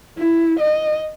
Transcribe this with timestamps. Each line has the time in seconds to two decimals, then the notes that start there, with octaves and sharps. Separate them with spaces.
0.18 E4
0.60 D#5